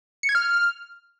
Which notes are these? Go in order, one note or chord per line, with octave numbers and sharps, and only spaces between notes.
C#7
G#6
F6